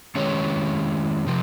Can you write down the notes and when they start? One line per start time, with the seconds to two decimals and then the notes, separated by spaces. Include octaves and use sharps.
0.15 D#3 G#3 C#4 G4 C#5
1.26 C3 F3